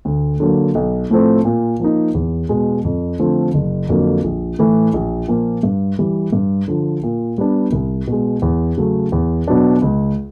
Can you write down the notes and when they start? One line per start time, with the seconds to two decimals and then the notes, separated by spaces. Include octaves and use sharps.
0.05 D2
0.40 D3 F#3 A#3
0.75 B1
1.10 A2 F3 A3 C4
1.45 A#2
1.80 F3 A#3 D#4
2.14 E2
2.49 B2 G#3
2.84 F2
3.19 D3 F3 A3 C4
3.54 F#1
3.89 F2 D3 F#3 A#3
4.24 A#1
4.59 A2 E3 A3
4.93 A#1
5.28 A#2 F3 A#3
5.63 G2
5.99 E3 G3
6.33 G2
6.68 D3 F3
7.03 A#2
7.38 G3 B3 D4
7.72 C2
8.07 B2 G#3
8.42 E2
8.78 C#3 F#3 A3
9.12 E2
9.48 B2 F#3 B3 D4
9.82 C#2